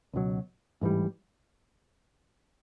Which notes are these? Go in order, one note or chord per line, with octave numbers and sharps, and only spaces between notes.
C#2 B2 F#3
A1 G#2 E3 G3